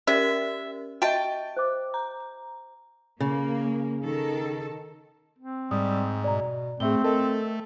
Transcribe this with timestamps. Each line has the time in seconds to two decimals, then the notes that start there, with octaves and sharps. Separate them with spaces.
0.07 C#4 G4 A#4 D5 E5
1.02 F#4 D#5 E5 G5 A5
1.57 C5 D6
1.94 A#5
3.20 C#3 A#3
4.04 D#3 A4
5.39 C4
5.71 G#2 G3 D#6
6.24 B2 D5 A#5
6.80 A2 A3 C4 G#4 E5 G7
7.04 A3 A4 A#4 D#5